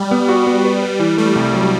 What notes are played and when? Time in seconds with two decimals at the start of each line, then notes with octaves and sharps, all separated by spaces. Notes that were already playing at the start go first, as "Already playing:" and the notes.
Already playing: G3
0.11 B3
0.29 F#4
0.47 B3
0.65 B4
0.83 B4
1.00 E3
1.17 G3 A3
1.35 C2
1.53 F#3